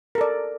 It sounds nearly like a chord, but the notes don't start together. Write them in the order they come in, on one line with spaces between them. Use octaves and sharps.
A#4 A4 D5